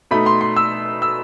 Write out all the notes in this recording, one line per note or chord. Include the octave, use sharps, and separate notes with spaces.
B2 A3 D#4 B5
C6
C6
E6
E6